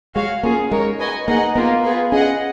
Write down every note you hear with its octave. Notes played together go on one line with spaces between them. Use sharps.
G#3 F#4 C#5 F5
A#3 C#4 F4 G#4
G#3 D#4 A#4 C#5
F#4 B4 D#5 G#5
A#3 D#4 G#4 D#5 F#5
A#3 B3 F4 A#4
B3 F4 G#4 B4
C#4 G#4 D#5 F#5